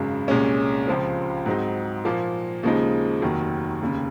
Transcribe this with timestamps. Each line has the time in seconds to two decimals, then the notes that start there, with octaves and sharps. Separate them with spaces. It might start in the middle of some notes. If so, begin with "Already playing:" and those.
Already playing: G#1 F#2 C#3 G#3
0.28 C2 A#2 G#3 C#4
0.87 C#2 C#3 F3 C4 F4
1.46 G#2 F#3 C4 D#4
2.05 A#2 F3 A#3
2.63 D#2 C#3 F3 G#3 D#4
3.22 F1 D#2 D#3 F#3
3.81 F1 D#2 C#3